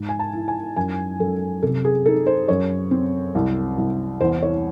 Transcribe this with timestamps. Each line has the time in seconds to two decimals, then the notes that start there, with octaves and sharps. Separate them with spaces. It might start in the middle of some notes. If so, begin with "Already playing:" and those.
Already playing: G#2
0.09 G#5
0.19 A5
0.33 E4
0.48 G#5
0.76 F#2 G#5
1.19 F#2 A4
1.62 C3 A4
1.85 G#4
2.06 D#4 A4
2.27 C5
2.48 F#2 C#5
2.91 C4
3.35 C2
3.78 C2
4.21 E2 C5
4.42 C#5